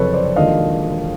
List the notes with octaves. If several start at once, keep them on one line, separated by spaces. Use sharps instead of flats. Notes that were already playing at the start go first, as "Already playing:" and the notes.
Already playing: F#1 F2 C3 A4 B4 C#5
C5 D5
E1 D#2 D3 F3 A#3 D#5 F5